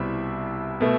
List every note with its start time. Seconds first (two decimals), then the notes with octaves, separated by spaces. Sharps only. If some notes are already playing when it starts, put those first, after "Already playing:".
Already playing: C2 B2 G3 C4 E4 E5
0.81 B2 A3